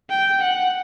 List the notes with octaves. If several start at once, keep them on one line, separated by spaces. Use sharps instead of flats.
G5
F#5